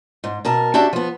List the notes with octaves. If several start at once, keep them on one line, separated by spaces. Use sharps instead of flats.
G#2
B2 A#4 A5
D4 F#4 G4 E5 A5
F3 B3